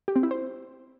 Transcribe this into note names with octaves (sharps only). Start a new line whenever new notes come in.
G4
C4
E4
C5